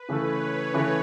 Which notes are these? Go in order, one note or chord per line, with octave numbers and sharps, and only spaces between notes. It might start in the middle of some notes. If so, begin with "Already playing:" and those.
Already playing: B4
C#3 E3 A3 E4 A4 C#5
C#3 E3 A3 E4 A4